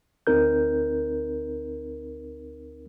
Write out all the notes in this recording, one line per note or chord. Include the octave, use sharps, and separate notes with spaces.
D2 C4 D#4 A#4 G6